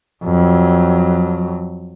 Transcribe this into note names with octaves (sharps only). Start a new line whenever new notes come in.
F2 F#3